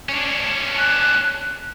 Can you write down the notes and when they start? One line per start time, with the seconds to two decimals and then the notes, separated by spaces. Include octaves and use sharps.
0.09 C#4 D4
0.78 F#6